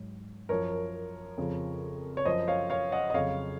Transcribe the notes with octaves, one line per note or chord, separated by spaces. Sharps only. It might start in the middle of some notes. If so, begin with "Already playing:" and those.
Already playing: G#2 F#3
F#2 F3 A#4 C#5
F2 C#3 F3
C#5
F#2 F3 C5 D#5
C#5 F5
C#5 F5
D#5 F#5
D#5
F2 C#3 F#3 C#5 F5